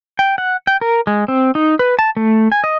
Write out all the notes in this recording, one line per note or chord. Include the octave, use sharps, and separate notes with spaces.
G5
F#5
G5
A#4
G#3
C4
D#4
B4
A5
A3
G#5
D#5